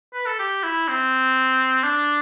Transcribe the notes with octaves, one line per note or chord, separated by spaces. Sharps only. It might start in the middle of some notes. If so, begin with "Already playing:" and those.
B4
A4
G4
E4
C4
D4